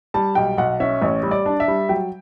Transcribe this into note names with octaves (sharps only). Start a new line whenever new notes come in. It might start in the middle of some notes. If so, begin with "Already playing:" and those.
G3 A5
B1 G5
B1 F#5
C#4 E5
A1 C#5
G3
D5
D4
E5
G3
F#3 G5